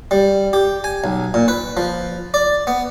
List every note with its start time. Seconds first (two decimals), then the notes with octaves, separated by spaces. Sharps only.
0.11 G3
0.53 G4
0.84 G#5
1.04 B1
1.34 A#2
1.48 B4
1.77 F3
2.34 D5
2.67 B3